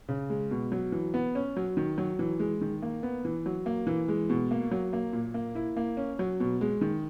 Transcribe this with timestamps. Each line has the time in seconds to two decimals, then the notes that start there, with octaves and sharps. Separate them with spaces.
0.08 C#3
0.30 G#3
0.51 B2
0.72 F#3
0.92 E3
1.14 B3
1.35 C#4
1.56 F#3
1.77 D#3
1.98 F#3
2.19 E3
2.39 G#3
2.61 D#3
2.82 A#3
3.03 B3
3.25 E3
3.46 F#3
3.66 A#3
3.87 E3
4.08 G#3
4.30 B2
4.51 A#3
4.71 F#3
4.93 A#3
5.13 A#2
5.34 A#3
5.55 E4
5.77 A#3
5.97 C#4
6.19 F#3
6.40 B2
6.61 G#3
6.81 D#3